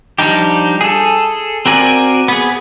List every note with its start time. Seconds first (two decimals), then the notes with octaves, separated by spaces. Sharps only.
0.19 F3 G3 D4 D#4 G4
0.81 G#4 A4
1.66 C4 F#4 A#4 D5 G#5
2.28 B3 G#4